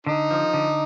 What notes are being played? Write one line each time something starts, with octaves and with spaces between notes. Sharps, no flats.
D3 D#4
F3
D3